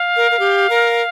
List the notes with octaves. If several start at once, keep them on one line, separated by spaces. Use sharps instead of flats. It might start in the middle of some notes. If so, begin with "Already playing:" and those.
Already playing: F5
A#4
A#4
G4
A#4